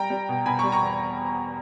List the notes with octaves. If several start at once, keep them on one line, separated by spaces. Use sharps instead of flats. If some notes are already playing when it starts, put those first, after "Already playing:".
Already playing: G3 G5 A#5
G3
B2
B2 G#5 B5
G3 A#5 C#6
A#5 C#6
E2